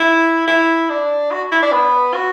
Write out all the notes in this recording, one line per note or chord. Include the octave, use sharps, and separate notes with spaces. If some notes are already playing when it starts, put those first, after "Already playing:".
Already playing: E4
E4
D4
F#4
E4
D4
B3
F#4